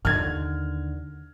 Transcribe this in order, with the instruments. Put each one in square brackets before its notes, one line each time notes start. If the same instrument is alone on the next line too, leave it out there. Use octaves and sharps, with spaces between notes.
[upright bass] D#2 D3 [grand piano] F6 G#6